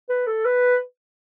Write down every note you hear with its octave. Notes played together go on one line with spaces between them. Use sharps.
B4
A4
B4